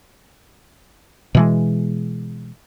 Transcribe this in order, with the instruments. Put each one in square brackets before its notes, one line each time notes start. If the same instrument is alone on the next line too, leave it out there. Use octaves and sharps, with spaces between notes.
[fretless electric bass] B2 E3 G#3